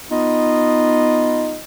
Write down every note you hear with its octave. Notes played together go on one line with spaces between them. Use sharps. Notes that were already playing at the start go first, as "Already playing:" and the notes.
B3 D#4 F4 D#5